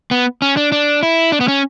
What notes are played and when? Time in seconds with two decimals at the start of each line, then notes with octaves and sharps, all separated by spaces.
0.11 B3
0.42 C#4
0.57 D4
0.72 D4
1.03 E4
1.32 D4
1.41 B3
1.48 C#4